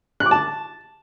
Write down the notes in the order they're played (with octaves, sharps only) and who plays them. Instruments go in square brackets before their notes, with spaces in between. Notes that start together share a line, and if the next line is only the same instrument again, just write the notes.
[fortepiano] F#6
D6
A5